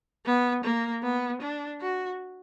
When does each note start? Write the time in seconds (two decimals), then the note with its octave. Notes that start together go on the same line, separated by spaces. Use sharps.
0.25 B3
0.64 A#3
1.03 B3
1.41 D4
1.80 F#4